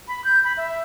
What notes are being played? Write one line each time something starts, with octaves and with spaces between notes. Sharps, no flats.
B5
G6
B5
E5